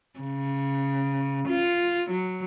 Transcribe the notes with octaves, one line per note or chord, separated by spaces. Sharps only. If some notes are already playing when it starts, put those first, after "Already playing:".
C#3
F4
F#3